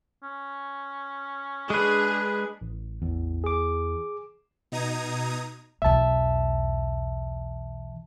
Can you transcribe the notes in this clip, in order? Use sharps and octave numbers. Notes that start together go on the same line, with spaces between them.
C#4
G#3 D4 G#4 B4
A1
E2
G#4 D6
B2 D#4 A#5 D#6 G#6
B1 E2 E5 A5